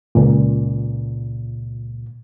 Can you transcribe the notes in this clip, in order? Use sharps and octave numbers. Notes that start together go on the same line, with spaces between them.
C#2 A#2